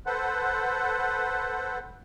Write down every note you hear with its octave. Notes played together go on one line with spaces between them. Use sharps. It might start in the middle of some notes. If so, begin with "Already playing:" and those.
A4 B4 C5 F#5